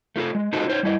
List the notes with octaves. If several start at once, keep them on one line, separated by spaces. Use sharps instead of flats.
A3 F4 G4 A4
G#3
D#4 F4 F#4 A4 C5 D#5
D#4 C5 C#5
G3 E4 D#5